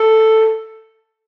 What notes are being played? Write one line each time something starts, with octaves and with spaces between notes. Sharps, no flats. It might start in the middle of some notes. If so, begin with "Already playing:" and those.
Already playing: A4